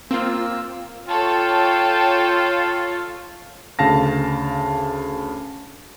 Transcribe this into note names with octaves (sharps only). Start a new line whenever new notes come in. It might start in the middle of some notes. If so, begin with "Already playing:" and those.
A#3 C4 F4 E6
F4 A4 C#5 G5
D2 C#3 F5 A5 A#6